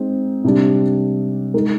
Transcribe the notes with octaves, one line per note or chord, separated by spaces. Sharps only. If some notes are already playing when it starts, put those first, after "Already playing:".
Already playing: G#3 C4 D#4
C3 G3 D4
G#3 D#4 A#4